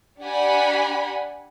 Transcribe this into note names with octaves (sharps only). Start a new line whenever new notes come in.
D4 G4 D5 F#5 G#5 B5